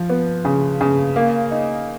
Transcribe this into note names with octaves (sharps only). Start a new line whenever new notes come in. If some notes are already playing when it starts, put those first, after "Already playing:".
Already playing: F3
B3
C#3
C#3
A#3
D#4